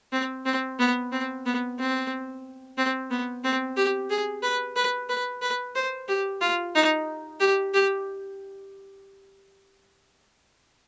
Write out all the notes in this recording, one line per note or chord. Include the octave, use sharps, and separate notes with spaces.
C4
C4
B3
C4
B3
C4
C4
B3
C4
G4
G#4
B4
B4
B4
B4
C5
G4
F4
D#4
G4
G4